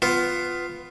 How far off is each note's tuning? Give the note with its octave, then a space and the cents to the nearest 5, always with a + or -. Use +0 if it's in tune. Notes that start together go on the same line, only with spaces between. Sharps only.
B3 +15 F4 +0